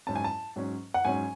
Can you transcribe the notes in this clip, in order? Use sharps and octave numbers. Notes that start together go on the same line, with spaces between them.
G#2 F#3 C#4 A5
G#5
A5
G#2 F#3 C#4
F#5
G#2 F#3 C#4 G#5